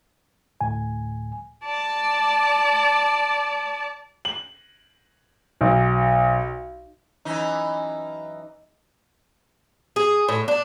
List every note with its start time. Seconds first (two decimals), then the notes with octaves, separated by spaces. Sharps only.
0.61 D2 A2 G#5
1.65 D5 A5
4.25 F#7
5.61 B1
7.25 F#2 E3 D#4
9.96 G#4
10.28 A2
10.48 D4